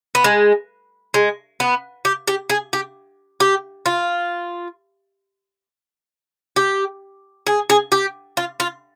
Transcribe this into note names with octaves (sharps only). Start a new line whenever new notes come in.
B3
G#3
G#3
B3
G4
G4
G#4
G4
G4
F4
G4
G#4
G#4
G4
F4
F4